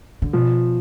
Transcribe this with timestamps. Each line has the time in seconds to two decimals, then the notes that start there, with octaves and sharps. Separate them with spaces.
0.22 D3
0.33 B2 F3